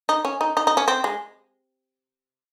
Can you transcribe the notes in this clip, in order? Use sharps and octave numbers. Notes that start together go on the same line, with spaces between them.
D#4
C#4
D#4
D#4
D#4
C#4
C4
G#3